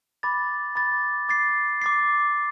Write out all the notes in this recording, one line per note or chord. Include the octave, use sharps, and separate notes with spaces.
B5 D6 A6
B5 D6 A6
D6 A6 C7
D6 A6 C7